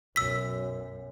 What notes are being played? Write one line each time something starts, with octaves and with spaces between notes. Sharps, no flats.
B1 F#2 E6 B6